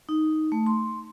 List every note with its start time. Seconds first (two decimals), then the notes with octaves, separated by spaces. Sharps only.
0.09 D#4
0.52 A3
0.66 C6